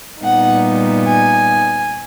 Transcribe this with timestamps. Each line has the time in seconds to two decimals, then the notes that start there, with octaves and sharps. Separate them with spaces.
0.22 A#2 G3 B3 D#4 F#5
1.06 G#5